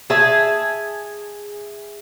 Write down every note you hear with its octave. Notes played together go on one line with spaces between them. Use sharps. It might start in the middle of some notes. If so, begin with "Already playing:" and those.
G#4 E5 A5